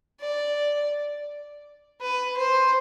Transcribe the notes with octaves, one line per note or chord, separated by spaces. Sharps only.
D5
B4
C5